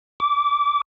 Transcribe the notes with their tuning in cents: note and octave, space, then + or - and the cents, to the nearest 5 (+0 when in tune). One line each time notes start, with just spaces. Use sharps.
D6 -20